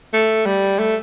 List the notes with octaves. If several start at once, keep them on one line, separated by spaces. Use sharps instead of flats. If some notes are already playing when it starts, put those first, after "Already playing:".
A3
G3
A3